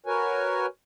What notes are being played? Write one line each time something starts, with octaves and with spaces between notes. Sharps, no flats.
F#4 A#4 B4 C#5 G#5